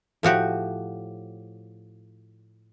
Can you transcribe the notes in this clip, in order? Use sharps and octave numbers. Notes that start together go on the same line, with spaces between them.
A2 F3 F#4 G4